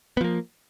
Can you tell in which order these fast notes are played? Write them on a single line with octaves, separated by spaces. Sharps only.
B3 F3 A#3